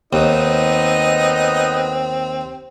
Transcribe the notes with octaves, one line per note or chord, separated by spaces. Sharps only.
D#2 B3 C4 D#4 D#5